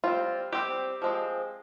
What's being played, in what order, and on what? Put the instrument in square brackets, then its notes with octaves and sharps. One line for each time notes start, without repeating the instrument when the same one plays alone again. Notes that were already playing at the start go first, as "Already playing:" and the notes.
[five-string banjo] G3 C4 F4
G3 C4 G4
F3 G#3 C4